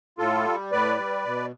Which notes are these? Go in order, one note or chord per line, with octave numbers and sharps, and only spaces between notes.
A2 F4 A4
G3
A2 B4 D5
G3
B2